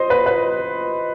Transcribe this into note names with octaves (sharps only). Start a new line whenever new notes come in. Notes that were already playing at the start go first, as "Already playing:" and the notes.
Already playing: C5 D#5
B4
B4